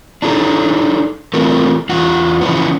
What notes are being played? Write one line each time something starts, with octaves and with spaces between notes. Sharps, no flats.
D4 D#4 G#4 A4
E3 A3 C4 F4 A4 A#4
E2 F4 F#5
C#3 E3 F3 B3